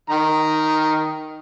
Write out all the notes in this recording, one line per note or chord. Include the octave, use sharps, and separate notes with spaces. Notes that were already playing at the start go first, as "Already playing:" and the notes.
D#3 A#5